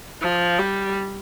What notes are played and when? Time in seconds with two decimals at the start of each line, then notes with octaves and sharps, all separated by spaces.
0.22 F3
0.59 G3